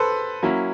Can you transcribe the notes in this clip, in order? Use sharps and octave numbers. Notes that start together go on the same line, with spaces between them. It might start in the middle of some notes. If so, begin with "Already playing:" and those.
Already playing: A4 B4 C5
F#3 A#3 C#4 E4